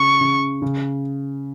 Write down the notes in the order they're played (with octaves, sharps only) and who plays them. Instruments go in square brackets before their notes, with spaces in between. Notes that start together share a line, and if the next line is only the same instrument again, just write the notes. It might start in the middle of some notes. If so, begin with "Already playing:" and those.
Already playing: [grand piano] C#3 [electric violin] C#6
[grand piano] C#3
C#3